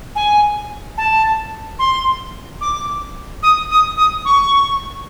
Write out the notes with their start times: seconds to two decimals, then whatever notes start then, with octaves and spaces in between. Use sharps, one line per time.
0.16 G#5
0.98 A5
1.79 C6
2.61 D6
3.43 D#6
3.71 D#6
3.97 D#6
4.25 C#6